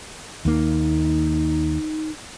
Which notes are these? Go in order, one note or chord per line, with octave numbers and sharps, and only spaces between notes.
D#2 A#3 D#4